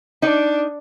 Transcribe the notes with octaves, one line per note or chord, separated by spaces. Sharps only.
D4 D#4 D5